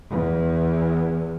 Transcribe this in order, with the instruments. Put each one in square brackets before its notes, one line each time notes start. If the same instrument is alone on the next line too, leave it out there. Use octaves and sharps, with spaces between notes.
[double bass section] E2